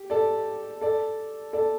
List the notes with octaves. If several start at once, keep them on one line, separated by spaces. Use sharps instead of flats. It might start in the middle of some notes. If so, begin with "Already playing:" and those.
Already playing: G4
A4 D5
A4 D5
A4 D5